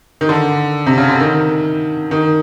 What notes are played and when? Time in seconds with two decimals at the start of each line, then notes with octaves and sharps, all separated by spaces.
0.21 D#3
0.29 D3
0.86 C3
0.98 C#3
1.09 D3
1.20 D#3
2.11 D#3